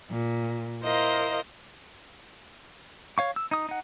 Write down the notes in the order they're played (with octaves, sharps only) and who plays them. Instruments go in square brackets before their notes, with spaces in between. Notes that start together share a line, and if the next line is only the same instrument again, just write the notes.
[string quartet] A#2
E4 A#4 C5 D#5 F5
[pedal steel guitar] C#5 F5 C#6
E6
D#4 D#6
D#4 F#5